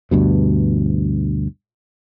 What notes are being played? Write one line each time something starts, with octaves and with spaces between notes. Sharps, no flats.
D2 G2 B2